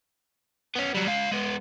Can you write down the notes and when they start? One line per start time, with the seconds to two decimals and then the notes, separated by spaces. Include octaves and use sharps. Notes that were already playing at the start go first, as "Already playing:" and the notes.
0.75 B3 C#4
0.95 F#3 G3
1.07 G#3 F5
1.31 G#3 B3